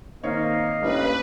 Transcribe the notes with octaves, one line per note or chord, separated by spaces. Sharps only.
D#3 A#3 C4 C#5 D#5 F5
G2 A3 A#3 C#4 E4 B4